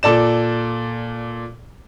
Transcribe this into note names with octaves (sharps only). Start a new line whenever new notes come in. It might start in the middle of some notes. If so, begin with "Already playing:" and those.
A#2 A4 D5 E7